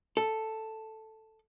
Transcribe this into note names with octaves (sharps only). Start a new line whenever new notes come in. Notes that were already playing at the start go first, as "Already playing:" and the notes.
A4